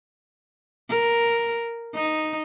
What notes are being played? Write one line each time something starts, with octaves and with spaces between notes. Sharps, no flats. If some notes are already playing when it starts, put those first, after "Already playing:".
A#4
D#4